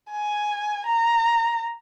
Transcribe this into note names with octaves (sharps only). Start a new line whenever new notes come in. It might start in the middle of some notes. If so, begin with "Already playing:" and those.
G#5
A#5